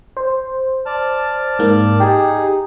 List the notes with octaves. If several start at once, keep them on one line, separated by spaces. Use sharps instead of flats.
C5
D5 A5 F6
G#2 A#3
D#4 G4 G#4